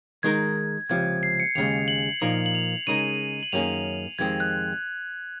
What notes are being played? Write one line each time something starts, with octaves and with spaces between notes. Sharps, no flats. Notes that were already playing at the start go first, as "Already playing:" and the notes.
D#3 G#3 D#4 A#4 G#6
C#2 C3 F3 G#6
C7
C#7
D#2 C#3 G#3 F7
F#7
A#2 F3 A#3 D#4 A#4 F7
F#7
F7
C#3 G#3 D#4 A#4 D#7
F#7
F#2 D#3 A#3 C#4 G#4 F7
F2 C3 D#3 G#3 C4 G#6
F#6